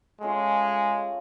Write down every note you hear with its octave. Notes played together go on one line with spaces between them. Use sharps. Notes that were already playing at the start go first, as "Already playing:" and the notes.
G#3 A3 C#4 F4